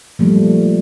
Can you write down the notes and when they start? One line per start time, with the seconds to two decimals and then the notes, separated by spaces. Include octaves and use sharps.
0.19 F3 G3 A3 A#3